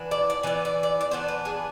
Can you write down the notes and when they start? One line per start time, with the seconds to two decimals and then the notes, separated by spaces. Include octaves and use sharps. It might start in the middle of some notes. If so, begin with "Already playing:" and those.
Already playing: E3 B3 D4
0.11 D5
0.30 D5
0.43 E3 B3 D4
0.47 D5
0.65 D5
0.83 D5
1.01 D5
1.11 E3 B3 D4 C5
1.28 B4
1.45 G#4